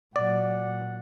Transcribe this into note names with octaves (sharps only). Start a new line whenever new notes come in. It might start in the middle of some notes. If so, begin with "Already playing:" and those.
A#2 F#3 D5 F#5